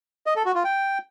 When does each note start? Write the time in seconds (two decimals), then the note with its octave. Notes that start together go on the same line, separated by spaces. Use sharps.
0.26 D#5
0.36 A4
0.45 F#4
0.55 F4
0.64 G5